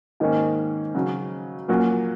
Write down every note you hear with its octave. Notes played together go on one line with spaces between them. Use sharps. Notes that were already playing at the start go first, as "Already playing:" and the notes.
G#2 D#3 A#3 C#4 G#4
C#3 F#3 C#4
A#2 F#3 A#3 C#4 F#4